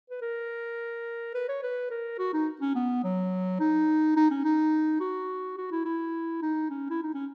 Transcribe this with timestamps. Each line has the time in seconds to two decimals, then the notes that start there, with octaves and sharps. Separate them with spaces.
0.10 B4
0.22 A#4
1.34 B4
1.49 C#5
1.63 B4
1.90 A#4
2.19 F#4
2.33 D#4
2.61 C#4
2.75 B3
3.04 F#3
3.60 D#4
4.17 D#4
4.31 C#4
4.45 D#4
5.00 F#4
5.58 F#4
5.71 E4
5.85 E4
6.42 D#4
6.70 C#4
6.90 E4
7.03 D#4
7.14 C#4